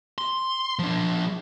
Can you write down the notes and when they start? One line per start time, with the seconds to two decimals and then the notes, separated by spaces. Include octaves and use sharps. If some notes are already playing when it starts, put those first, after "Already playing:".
0.18 C6
0.79 F3 D4